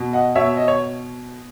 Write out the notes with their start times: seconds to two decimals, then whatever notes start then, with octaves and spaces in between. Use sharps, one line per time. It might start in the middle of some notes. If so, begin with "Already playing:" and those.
Already playing: B2
0.13 D#5 F#5
0.35 B2 C#5 E5
0.57 D#5
0.68 C#5